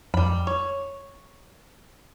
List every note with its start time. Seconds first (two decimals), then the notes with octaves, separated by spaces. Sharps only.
0.14 F2 G3 B5
0.47 C#5